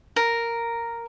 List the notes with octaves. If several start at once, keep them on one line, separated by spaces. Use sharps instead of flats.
A#4